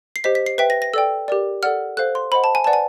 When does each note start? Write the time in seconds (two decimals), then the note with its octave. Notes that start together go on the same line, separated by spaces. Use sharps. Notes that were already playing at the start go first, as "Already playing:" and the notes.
0.16 C7
0.24 G4 C5 D#5 B6
0.35 B6
0.46 C7
0.58 B4 E5 G5 B6
0.70 A#6
0.82 A#6
0.94 A4 D5 G5 E6
1.28 G4 A#4 D5
1.63 A4 D5 F#5 F6
1.97 A4 C5 F5 F#6
2.15 C6
2.32 C5 D#5 F#5 B5
2.44 A5
2.55 G#5
2.64 B4 D5 F#5 A5
2.73 G#5